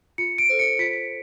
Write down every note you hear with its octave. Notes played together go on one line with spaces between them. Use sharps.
F4 C#7
D7
A4 C5
C#7
F4 B6